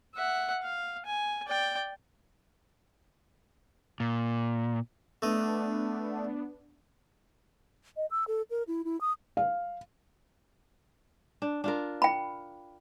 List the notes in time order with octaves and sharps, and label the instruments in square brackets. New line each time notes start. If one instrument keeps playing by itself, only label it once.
[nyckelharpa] E5 F#5
F5
G#5
D5 G5
[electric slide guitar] A#2
[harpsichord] A3 D#5 [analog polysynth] B3 D4
[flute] D#5
E6
A4
A#4
E4
E4
D#6
[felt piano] F5
[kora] D4
D4 F4 A#4
[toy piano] G5 B5